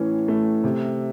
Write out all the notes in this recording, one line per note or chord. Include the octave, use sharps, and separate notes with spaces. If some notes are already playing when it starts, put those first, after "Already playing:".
Already playing: A2 E3 C#4
A3
C3